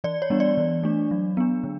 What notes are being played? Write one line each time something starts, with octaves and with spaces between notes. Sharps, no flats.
E3 D5
C#5
G3 B3 D4
D5
E3
A3 D4
F#3
B3 D4
D3